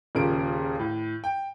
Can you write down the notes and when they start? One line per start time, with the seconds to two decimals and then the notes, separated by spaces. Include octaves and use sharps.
0.15 D#1 A#2 C#3 C#4 A#4 D7
0.79 A2
1.24 G5